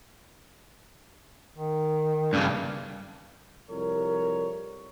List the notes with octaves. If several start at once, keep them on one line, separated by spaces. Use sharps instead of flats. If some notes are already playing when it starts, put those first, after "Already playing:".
D#3
G2 C#3 D4
C2 F2 A#4 C#5